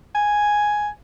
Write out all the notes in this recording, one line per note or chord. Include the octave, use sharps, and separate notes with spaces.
G#5